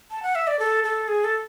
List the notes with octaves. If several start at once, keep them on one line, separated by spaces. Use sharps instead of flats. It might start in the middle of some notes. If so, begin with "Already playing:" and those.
A5
F#5
E5
D5
A4
A4
G#4
A4